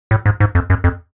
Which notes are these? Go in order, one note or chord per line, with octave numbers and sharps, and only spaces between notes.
A2
G#2
G#2
F2
F#2
F2